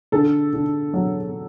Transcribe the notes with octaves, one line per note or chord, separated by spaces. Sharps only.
D3 A4
D3
F#3